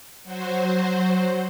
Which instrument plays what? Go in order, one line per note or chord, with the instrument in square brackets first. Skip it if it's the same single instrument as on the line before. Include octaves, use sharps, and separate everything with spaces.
[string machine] F#3 F#4 C5